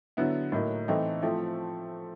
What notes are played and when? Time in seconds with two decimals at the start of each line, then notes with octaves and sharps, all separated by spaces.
0.17 D3 F#3 B3 E4
0.52 A2 F#3 A#3 D#4
0.88 E3 A3 C4 D#4
1.22 F3 A3 C4 E4